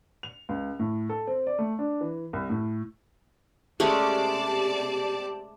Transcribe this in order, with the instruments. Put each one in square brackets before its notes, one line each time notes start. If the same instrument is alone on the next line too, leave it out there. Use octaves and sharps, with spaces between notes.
[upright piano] F7
C#2
A2
A4
C4
D5
A3
D4
E3
C2
A2
[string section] C3 D5 A5 [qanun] G#3 A3 C#4 [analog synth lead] G4